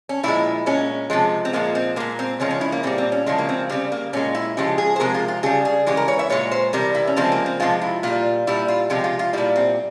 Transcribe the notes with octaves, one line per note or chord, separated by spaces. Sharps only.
C#4
A#2 F3 G#3 E4
A#2 G#3 C#4
C3 F3 G#3
C4
A#2 F3 G#3 A#3
C4
A#2 G#3 A#3
C4
C#3 F3 G#3 C#4
C#4
E4
A#3
A#2 G3 C4
C4
C#4
C#3 F3 G#3 E4
A#3
C4
C#3 G3 C4
A#3
A#2 G#3 C#4
E4
C#3 F3 G#3 G4
G#4
C5
C3 F3 G#3 A#4
F4
F4
C#3 G3 G#4
G#4
C#3 E3 G#3 G4
A#4
C#5
E5
A#2 G#3 C#5
C5
C3 E3 G3 A#4
E4
C#4
C#3 F3 G#3 C4
A#3
C4
C3 F3 G#3 F4
E4
A#2 G3 F4
A#2 G3 E4
F4
C3 F3 G#3 G4
F4
F4
A#2 G3 E4
C4